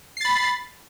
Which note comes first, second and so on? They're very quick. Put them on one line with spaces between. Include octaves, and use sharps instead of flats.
C7 A6 B5